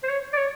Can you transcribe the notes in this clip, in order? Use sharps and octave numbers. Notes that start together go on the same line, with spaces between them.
C5
C#5
D5
C#5